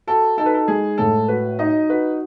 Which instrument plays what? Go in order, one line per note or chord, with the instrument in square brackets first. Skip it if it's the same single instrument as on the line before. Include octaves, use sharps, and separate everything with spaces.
[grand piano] F#4 [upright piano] A4
[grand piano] D#4 [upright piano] A4
[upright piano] B4
A4
[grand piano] G#3 [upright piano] G#4
[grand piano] A2 [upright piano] A4
[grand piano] F#4 [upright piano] B4
[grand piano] D#4 [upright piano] D#5
[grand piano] F#4 [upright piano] B4